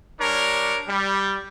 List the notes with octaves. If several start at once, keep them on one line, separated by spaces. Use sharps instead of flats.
G3 D4 A#4 C#5
G3